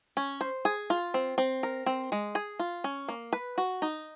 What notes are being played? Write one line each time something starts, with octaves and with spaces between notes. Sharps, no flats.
C#4
C5
G#4
F4
C4
C4
A#4
C4
G#3
G#4
F4
C#4
A#3
B4
F#4
D#4